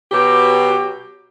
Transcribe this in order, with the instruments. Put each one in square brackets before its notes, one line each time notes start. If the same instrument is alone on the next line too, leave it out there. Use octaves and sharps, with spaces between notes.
[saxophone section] B2 F#3 G4